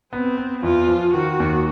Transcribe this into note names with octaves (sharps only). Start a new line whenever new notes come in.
B3 C4
B3
E2 F4
F3
D#3 F#4
D#2